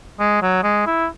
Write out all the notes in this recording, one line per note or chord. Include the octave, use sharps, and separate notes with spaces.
G#3
F#3
G#3
E4